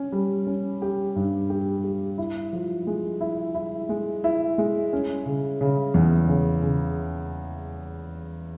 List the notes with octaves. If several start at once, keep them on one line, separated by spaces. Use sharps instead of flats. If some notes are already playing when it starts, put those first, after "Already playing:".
Already playing: C#4
G3
C#4
G4
G2
G4
G4
E4
F3
G#3
E4
E4
G#3
E4
G#3
C#4
C#3
C#3
E2
C#3
C#3